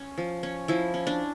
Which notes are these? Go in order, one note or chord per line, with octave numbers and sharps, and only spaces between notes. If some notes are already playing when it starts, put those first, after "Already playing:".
Already playing: C#4
F3
C#4
F3 E4
C#4
D4